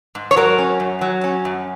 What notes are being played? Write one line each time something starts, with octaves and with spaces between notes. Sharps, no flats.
G#2
C#5
F#3 A#4
C#4
F#2
F#3
C#4
F#2